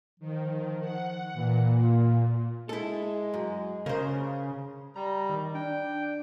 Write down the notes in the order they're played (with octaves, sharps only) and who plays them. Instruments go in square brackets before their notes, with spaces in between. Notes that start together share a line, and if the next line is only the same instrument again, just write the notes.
[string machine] D#3 [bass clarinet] F3
[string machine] F#5
[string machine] A#2 [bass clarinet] E3
[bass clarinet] F4
[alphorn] G#3 [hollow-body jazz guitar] E4 A4
[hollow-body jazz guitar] F#2
[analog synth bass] C#3 [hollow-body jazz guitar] A#4 C5
[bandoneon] G3 [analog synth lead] A#5
[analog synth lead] D#3
[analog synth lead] D4 [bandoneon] G5